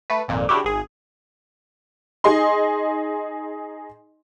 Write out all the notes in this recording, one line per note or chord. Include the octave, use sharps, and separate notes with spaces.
A3 B4
G#1 F2 A#2
C#3 D4 E4 F#4 G4
G#1 G#4
D#4 G#4 D#5 C6